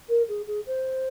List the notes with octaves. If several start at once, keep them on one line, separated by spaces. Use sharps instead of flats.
A#4
G#4
G#4
C5